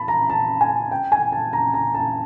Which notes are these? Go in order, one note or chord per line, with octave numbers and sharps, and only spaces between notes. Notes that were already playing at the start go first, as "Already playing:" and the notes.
Already playing: A5 B5
A#5
A5
G#5
G5
G#5
A5
A#5
A#5
A5